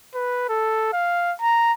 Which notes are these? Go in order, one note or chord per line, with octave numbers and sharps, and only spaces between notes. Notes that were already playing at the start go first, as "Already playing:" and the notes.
B4
A4
F5
A#5